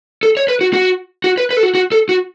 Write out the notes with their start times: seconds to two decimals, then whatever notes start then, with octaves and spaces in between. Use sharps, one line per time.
0.23 A4
0.37 C#5
0.48 B4
0.61 F#4
0.73 F#4
1.24 F#4
1.38 B4
1.51 B4
1.57 A4
1.63 F#4
1.75 F#4
1.92 A4
2.09 F#4